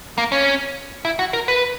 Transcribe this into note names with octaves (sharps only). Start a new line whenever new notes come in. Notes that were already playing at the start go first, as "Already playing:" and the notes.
A#3
C#4
E4
F#4
A#4
B4